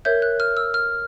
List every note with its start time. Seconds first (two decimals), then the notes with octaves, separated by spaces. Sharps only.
0.05 A#4 C#5 E5 G6
0.22 F#6
0.40 F6
0.57 E6
0.74 F6